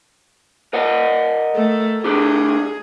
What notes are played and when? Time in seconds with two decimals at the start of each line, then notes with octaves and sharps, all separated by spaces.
0.73 A#4 D#5 F#5
1.55 A3
2.04 A3 D4 G4 G#4